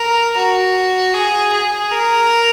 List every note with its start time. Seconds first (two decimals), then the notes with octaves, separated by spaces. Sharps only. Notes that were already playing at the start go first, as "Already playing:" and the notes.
Already playing: A#4
0.37 F#4
1.14 G#4
1.53 G#4
1.91 A#4